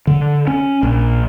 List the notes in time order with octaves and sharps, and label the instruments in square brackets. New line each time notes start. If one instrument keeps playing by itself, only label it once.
[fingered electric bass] D3
C#4
A#1